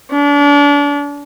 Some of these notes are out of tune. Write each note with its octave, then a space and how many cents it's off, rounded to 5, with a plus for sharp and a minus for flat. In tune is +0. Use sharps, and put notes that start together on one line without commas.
D4 -35